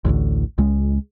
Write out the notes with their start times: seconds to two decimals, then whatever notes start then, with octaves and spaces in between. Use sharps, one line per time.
0.05 A1 D2 A2 D3
0.58 C#2 G#3